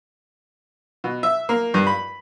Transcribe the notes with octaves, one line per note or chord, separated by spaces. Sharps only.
B2
E5
A#3
G2
B5